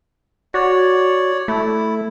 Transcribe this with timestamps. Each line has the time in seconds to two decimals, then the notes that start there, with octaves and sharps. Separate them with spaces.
0.54 F#4 C#5 D5
1.48 A3 E4